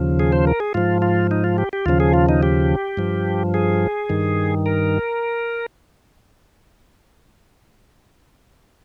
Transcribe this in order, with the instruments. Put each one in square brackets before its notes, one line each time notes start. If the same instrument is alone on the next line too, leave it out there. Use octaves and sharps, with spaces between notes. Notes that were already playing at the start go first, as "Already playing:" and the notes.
Already playing: [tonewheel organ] D#2 C#3 F3
G#4
C5
A#4
G#4
G#2 F3 F4
F4
D#4
F4
G4
G4
D#2 C#3 F3 F4
G#4
F4
D#4
G4
G2 F3
G#4
G2 D#3
A#4